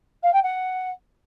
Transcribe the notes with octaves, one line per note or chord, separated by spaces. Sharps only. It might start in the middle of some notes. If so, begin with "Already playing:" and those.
F5
G5
F#5